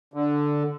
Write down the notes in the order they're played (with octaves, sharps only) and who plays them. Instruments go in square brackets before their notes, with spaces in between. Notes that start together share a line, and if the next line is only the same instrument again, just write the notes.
[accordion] D3